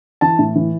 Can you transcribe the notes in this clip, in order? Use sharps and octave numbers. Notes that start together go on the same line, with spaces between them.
E3 A5
A2
E3